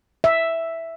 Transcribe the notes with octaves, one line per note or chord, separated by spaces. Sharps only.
E5